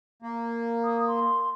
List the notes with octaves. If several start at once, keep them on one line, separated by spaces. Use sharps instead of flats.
A#3
D#6
C6